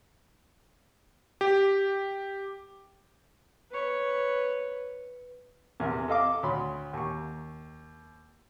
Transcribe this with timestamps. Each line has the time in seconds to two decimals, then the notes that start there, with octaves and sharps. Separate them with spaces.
1.41 G4
3.71 B4 C#5
5.80 E2 C3 A#4
6.08 A4 D#5 F5 D6
6.43 D2 C#5 B5 C6
6.93 D#2 C#6